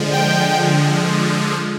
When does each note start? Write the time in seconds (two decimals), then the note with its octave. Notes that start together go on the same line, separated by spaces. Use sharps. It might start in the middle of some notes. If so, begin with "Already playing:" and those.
Already playing: D3 F3 G#3
0.13 G5